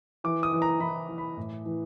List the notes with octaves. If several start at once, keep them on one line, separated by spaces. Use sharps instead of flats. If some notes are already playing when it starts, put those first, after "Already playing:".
E3 D6
D#6
E3
A#5
E3 B5
E3
B5
A2
E3